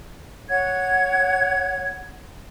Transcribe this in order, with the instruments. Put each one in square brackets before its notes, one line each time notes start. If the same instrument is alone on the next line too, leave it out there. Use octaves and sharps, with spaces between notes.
[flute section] C#5 F#5 G#6